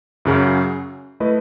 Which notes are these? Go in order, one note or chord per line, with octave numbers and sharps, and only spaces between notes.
F#2 C#3 F#3 C#4
A3 E4 B4 D#5